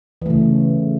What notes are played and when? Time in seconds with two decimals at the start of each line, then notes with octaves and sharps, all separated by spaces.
0.22 E3
0.26 A3
0.30 C#3